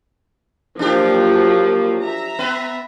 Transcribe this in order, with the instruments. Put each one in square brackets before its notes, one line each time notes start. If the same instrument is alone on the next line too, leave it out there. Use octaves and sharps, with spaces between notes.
[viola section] F3 F#3 A#3 [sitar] D4 G4
[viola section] E5 A#5
[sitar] B3 B4